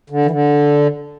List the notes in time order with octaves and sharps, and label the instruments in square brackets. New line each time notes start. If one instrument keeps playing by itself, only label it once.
[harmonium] D3
E3
D3